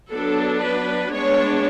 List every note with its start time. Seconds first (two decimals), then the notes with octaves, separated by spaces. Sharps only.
0.11 F#3 B3 D4 A4
0.61 B4
1.11 G#3 B3 D4 C#5